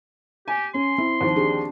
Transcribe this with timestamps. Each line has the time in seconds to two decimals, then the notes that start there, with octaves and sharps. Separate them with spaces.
0.48 G4 G#5
0.74 C#4 C6
0.98 C4 E4
1.21 D#2 F3
1.36 D4 G4 G#4